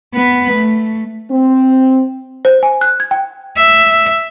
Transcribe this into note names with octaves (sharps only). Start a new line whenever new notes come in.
B3 B4
A3
C4
C5
G#5
F#6
G#6
G5
E5